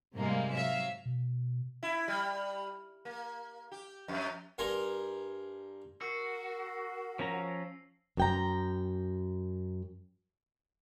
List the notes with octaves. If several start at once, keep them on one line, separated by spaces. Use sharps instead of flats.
G#2 C3 G3 G#3 A#3
F#3 E5 F5
B2
E4
G3
A#3
G4
F2
G2 A#4 G#5 A#5 C6
F#4 A#4 E6 C7
F3 C#4 A#5
F#2 G5 A#5